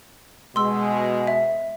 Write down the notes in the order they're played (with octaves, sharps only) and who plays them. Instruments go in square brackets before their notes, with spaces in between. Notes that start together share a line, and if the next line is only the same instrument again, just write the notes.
[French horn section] B2 G#3 [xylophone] C6 E6
[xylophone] E5